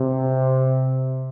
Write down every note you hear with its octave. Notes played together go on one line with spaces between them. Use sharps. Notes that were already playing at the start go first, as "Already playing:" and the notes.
Already playing: C3